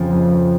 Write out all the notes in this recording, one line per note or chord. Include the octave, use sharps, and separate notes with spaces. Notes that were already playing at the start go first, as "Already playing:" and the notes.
Already playing: F2 C#3 F3
F2 C#3 F3